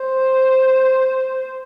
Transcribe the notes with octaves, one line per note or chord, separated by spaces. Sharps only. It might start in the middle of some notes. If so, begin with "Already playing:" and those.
Already playing: C5